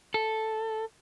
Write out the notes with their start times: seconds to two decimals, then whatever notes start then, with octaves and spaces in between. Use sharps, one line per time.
0.14 A4